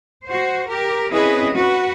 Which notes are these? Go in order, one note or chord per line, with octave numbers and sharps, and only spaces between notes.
F#4 C5
G4 A#4
C4 C#4 E4 G#4 B4 D#5
F#4 B4